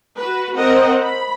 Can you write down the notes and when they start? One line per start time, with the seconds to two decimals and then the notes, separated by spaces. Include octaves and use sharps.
0.16 F#4 B4
0.57 C4 A#4 D#5 F#5
1.02 B5